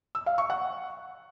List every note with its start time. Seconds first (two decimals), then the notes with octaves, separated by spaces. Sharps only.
0.15 E6
0.26 F5
0.38 C#6
0.50 F#5